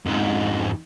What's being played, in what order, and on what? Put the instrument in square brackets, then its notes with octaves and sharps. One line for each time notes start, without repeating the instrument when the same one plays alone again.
[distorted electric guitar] F2 G#2